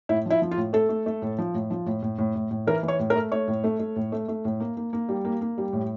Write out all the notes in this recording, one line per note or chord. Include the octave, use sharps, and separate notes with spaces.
A2 E4
F3 E4
F3
F4
A2
A3 A4
A3
A3
A2
F3
A2
F3
A2
A2
A2
A2
A2
E3 A#4
E3
C#5
A2
A#4
A3
A3 C#5
A2
A3
A3
A2
A3
A3
A2
A#3
A#3
A#3
G3
A#3
A#3
G3
A2